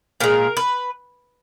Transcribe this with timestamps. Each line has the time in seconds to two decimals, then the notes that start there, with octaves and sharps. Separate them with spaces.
0.20 A#2 G#3 A#4
0.57 B4